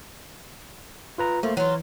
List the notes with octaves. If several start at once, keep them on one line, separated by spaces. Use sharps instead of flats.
F4 B4 A#5
F3 A3 A#3
E3 F#3 F4